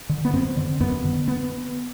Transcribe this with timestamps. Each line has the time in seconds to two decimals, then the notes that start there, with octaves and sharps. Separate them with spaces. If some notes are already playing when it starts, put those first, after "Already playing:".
0.09 D3
0.25 B3
0.33 F#2 C4
0.57 D3
0.80 F#2 B3
1.04 D3
1.28 B3